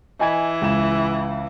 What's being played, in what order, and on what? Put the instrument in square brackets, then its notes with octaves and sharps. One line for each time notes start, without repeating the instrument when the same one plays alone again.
[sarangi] E3 [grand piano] D#5 G#5 G#6
[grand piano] C#2 E7